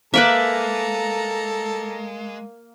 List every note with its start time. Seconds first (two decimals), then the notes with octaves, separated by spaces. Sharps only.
0.14 G#3 A#3 A4 B4 D5 E5 A#5